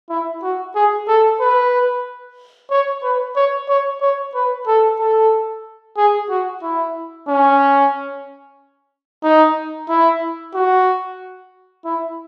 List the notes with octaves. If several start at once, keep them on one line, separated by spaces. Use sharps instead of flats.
E4
F#4
G#4
A4
B4
C#5
B4
C#5
C#5
C#5
B4
A4
A4
G#4
F#4
E4
C#4
D#4
E4
F#4
E4